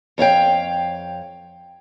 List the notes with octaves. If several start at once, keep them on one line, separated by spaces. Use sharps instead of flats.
F2 C#5 F5 G5